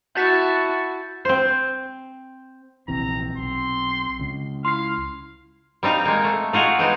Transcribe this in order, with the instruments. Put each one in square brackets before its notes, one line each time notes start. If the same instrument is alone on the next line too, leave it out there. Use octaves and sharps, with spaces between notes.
[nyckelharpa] E4 A5 [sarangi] F#4 [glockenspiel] G6 A6 B6
[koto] C4 C5
[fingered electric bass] A#1 C3 E3 [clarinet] C4 [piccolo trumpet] A#5
[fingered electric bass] B1 [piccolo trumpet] C6
[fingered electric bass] C#2 C#3
[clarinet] E4 [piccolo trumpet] F5 [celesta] C6 C7
[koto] G3 C4 D#4 F5
G#3 A#3
A3
D#4 F4 F#4 G#4
G#3 B3 C4 D#4